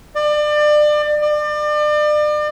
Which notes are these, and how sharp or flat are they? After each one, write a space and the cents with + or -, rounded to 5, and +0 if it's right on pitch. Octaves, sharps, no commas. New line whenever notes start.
D5 +30
D5 +35